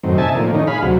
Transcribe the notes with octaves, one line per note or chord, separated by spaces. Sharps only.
F#2 A2 D#3 C4
C3 D#4 E5 G#5 A5
A2 D3 F3 A#3
A2 D#3 C#4 D#4
G#4 F5 B5
D2 C3 F#3